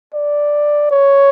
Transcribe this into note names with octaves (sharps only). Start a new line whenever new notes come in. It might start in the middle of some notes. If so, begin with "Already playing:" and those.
D5
C#5